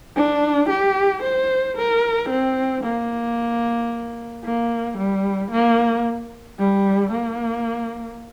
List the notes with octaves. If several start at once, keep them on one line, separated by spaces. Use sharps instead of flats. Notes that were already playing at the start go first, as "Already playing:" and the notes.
D4
G4
C5
A#4
C4
A#3
A#3
G3
A#3
G3
A#3